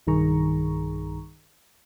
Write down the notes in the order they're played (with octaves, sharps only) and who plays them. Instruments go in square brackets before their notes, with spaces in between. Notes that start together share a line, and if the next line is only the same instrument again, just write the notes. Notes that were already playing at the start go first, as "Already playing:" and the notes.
[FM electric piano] B1 G2 D#3 G#4 A#5 C#6